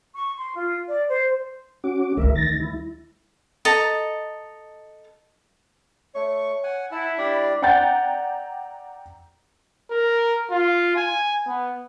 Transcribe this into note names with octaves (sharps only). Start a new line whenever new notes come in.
C#6
C6
F4
D5
C5
C#4 F#4 D6
D2 G3 A#4 E5
D#3 A6 A#6
E4
A4 D#5 A#5
A3 C#5 C#6
F#5 G#5
E4 F#5 A5
G3 D4 G4 D5
D5 F#5 G5 A#5 G6 A6
A#4
F4
G#5
B3